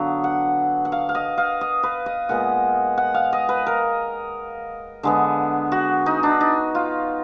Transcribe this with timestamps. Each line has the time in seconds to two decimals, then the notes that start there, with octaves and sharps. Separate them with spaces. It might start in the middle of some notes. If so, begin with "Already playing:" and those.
Already playing: D3 F#3 B3 F5
0.24 F#5
0.85 F#5
0.92 F5
1.09 F5
1.15 D#5
1.38 F5
1.61 D#5
1.83 B4
2.06 D#5
2.29 A#2 G#3 B3 F#5
2.97 F#5
3.14 F5
3.33 D#5
3.49 B4
3.66 A#4
5.03 D3 G#3 B3
5.72 F#4
6.06 D#4
6.23 D4
6.41 D#4
6.75 F4